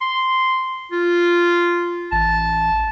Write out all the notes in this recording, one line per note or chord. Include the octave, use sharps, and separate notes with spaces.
C6
F4
A1 A5